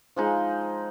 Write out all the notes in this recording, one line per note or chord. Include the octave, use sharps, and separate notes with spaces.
F3 G#3 D#4